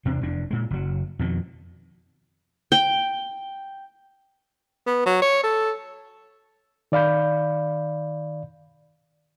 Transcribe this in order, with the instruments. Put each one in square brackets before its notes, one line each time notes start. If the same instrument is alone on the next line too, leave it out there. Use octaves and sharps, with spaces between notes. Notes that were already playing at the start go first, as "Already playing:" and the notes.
[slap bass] E2 C3 C4 D4
F1 E2 D4
A#2 G#3
F#1 F#3
F2 B2 D#3
[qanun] G5
[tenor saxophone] B3
F#3
C#5
A4
[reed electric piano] D#3 D5 F5 B5 G6